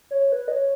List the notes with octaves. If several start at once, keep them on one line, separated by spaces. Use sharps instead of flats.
C#5
B4
D#5
C#5